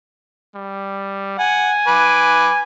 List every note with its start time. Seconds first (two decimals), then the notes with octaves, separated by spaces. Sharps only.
0.56 G3
1.39 F#5 G#5
1.87 B4 D6